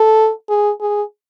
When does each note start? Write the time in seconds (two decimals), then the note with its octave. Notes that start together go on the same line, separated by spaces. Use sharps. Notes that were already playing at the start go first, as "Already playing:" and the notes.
Already playing: A4
0.49 G#4
0.81 G#4